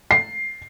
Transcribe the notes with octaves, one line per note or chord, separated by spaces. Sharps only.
C7